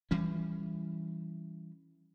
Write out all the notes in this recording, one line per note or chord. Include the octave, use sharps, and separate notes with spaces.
E3 G3 C#4